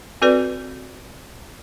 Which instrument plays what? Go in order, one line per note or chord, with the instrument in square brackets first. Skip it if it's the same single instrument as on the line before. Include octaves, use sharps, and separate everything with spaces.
[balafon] C4 F#4 A4 B4 D5